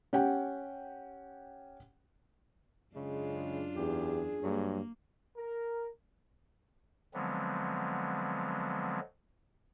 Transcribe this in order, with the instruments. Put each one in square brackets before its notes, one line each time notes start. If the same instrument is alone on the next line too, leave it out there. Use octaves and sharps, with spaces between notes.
[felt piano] C#4 G4 F#5 G5
[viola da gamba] F#2 D4 F4 [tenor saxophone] C#3 [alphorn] G#3
[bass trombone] E2 [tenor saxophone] G4 [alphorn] G#4
[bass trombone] G2 [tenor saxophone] F#3 [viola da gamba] A#3
[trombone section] A#4
[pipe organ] D3 F3 F#3 G#3 B3 C4